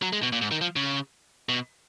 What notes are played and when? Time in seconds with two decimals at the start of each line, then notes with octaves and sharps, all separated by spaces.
0.02 F#3
0.13 G#3
0.23 B2
0.32 A#2
0.42 G#2
0.51 D#3
0.61 F3
0.76 C#3
1.49 B2